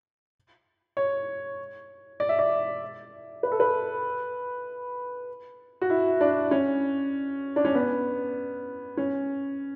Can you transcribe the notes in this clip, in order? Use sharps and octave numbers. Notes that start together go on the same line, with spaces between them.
C#5
D5
E5
D5
B4
A4
B4
F#4
E4
D4
C#4
D4
C#4
B3
C#4